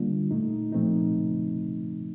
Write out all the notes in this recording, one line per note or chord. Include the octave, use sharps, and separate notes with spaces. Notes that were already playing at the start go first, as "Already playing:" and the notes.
Already playing: D3 G3 A#3 D4 F4
A#2 A3 D#4
A#2 F3 A3 C4 D#4